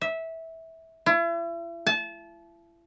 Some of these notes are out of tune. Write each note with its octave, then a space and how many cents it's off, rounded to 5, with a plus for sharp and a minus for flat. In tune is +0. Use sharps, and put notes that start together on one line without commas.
E5 -15
E4 +40
A5 -30